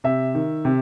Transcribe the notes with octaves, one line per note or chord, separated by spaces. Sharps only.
C3 E5
D#3
C3